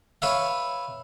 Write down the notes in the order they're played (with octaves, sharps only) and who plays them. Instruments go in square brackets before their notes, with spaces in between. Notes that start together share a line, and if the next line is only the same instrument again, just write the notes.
[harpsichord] B4 C#5 E5 F5